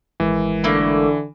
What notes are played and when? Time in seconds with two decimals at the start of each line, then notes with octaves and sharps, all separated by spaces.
0.20 G#1 E3 G#3 A#4
0.64 D3 A3 A#3 E4